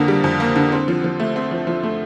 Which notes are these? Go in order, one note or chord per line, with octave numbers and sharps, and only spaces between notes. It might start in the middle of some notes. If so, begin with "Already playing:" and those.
Already playing: F2 D3 A#3
G3
F2
A#3
D3
C4
F3
F3
A3
C4
F3
F3
A3